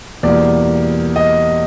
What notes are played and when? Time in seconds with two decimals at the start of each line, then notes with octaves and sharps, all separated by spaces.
0.23 E2 B2 G3 A#3 D5
1.16 D#5